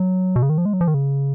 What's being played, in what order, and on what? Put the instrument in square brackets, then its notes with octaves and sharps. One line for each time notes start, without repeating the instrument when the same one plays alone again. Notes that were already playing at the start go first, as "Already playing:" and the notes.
Already playing: [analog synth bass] F#3
B2
C#3
D#3
F3
G#3
F#3
F3
D#3
C#3